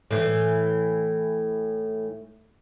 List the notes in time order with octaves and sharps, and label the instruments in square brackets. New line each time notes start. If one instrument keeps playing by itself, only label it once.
[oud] A2 E3